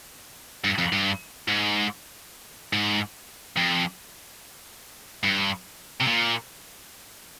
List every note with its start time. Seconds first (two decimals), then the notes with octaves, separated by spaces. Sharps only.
0.64 G2
0.78 F2
0.92 G2
1.48 G#2
2.73 G#2
3.57 F2
5.24 G2
6.01 C3
6.08 A#2